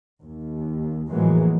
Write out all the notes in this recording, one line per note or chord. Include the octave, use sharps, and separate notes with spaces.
D#2
F2 A2 E3 F#3 G#3 A#3